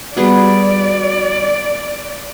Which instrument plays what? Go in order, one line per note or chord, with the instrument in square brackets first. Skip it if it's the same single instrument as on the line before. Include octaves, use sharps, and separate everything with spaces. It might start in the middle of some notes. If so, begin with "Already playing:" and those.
[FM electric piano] G3 F#4 [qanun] B3 G#4 B4 [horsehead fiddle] D5